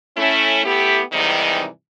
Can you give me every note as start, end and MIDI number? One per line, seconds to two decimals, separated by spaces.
0.17 0.62 57
0.17 0.62 61
0.17 0.62 64
0.65 1.01 57
0.65 1.01 59
0.65 1.01 64
0.65 1.01 67
1.13 1.67 44
1.13 1.67 48
1.13 1.67 51
1.13 1.67 52
1.13 1.67 55
1.13 1.67 63